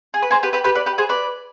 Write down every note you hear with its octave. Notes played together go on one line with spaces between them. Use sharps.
G#4
B4
G#4 C5
G4 B4
G4 B4
G4 B4
B4 D5
G4 B4
G#4 C5
B4 D5